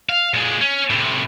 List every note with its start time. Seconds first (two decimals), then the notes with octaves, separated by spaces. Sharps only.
0.09 F5
0.34 A#2 G#3
0.61 C#4
0.90 A2 C3